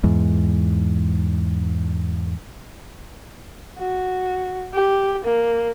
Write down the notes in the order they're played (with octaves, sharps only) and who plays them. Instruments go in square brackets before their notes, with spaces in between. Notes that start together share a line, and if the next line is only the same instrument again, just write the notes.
[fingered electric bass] E2 G#2
[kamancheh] F#4
G4
A#3